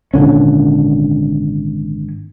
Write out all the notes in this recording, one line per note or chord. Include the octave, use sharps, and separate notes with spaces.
G#1 A#2 D3 C#4